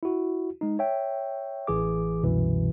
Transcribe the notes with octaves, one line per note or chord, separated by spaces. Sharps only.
E4 F#4
G#3 D#4
C#5 E5 G5
A1 E3 G#4 D6
C2 F#2 B2 E3